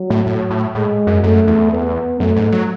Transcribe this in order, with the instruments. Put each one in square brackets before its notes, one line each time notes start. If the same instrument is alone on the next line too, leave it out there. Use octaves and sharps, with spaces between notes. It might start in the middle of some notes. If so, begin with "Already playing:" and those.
Already playing: [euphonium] F#3
[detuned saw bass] A2
A2
A2
[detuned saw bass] A2 [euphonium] G#3
[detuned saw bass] F#2
[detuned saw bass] F#2 [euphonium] A3
[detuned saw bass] E2
[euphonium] B3
[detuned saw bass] F#2 [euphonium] A3
[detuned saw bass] G#2
F#3